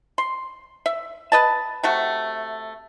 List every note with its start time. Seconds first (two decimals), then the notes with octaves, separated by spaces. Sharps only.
0.18 C6
0.86 E5
1.32 B4 D#5 A5
1.83 C3 A3 F#4